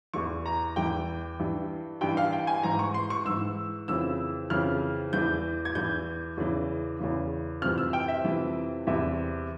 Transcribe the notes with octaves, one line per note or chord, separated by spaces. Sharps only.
E2 E3 C#6
A#5
E2 E3 G5
G2 E3
G2 E3 G5
F5
G5
G#5
G#2 E3 A#5
C#6
C6
C#6
G#2 E3 E6
F2 C#3 E3 E6
F2 C#3 E3 F6
E2 E3 G6
G#6
E2 E3 G6
E2 C#3 E3
E2 C#3 E3
F2 C3 E3 F6
E6
G5
E5
F2 C3 E3
E2 C3 E3 E5